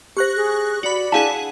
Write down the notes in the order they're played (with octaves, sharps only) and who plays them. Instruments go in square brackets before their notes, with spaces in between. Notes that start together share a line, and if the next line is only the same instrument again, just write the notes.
[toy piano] G4 C5 [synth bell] C#6 F#6 A#6
[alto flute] G#4
[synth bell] F#4 B5 [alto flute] D5
[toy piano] D4 F5 A5 [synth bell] E4 G#4 F#5